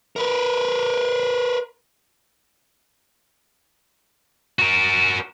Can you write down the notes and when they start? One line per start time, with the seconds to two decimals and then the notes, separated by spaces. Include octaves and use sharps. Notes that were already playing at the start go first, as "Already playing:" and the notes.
0.16 A#4 B4
4.59 F#4 A#4